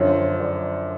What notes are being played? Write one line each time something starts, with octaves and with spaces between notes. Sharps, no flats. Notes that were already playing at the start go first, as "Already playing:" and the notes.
Already playing: F#2 D3 F3 C#5
D5